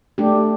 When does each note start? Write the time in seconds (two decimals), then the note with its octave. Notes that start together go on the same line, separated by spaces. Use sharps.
0.18 A3 D4 G4